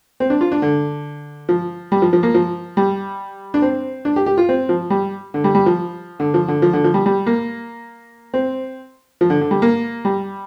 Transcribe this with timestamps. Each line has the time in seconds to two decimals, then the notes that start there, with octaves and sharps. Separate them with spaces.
0.20 C4
0.30 D4
0.41 F4
0.52 D4
0.62 D3
1.49 F3
1.92 G3
2.02 F3
2.13 F3
2.23 A#3
2.35 F3
2.77 G3
3.54 D4
3.62 C4
4.05 D4
4.16 G4
4.26 G4
4.38 F4
4.49 C4
4.69 F3
4.90 G3
5.34 D3
5.44 G3
5.55 G3
5.66 F3
6.20 D3
6.34 F3
6.48 D3
6.62 F3
6.73 D3
6.84 F3
6.94 G3
7.06 G3
7.26 A#3
8.34 C4
9.21 F3
9.30 D3
9.41 D3
9.51 G3
9.62 A#3
10.05 G3